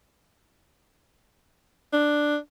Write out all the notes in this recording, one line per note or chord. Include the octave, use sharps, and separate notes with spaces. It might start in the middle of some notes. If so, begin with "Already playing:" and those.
D4